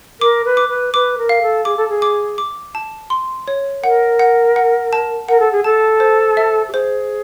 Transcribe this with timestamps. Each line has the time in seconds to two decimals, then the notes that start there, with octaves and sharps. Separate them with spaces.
0.20 A#4 D6
0.45 B4
0.57 D6
0.69 B4
0.94 B4 D6
1.18 A#4
1.29 F5
1.42 A4
1.65 G#4 D6
1.77 A4
1.89 G#4
2.02 D6
2.38 D6
2.75 A5
3.10 C6
3.48 C#5
3.83 A#4 F#5
4.19 F#5
4.56 F#5
4.93 A5
5.29 A#4 F#5
5.40 A4
5.52 G#4
5.64 A4 A5
6.00 C5
6.37 E5
6.69 G4
6.73 G#4 C5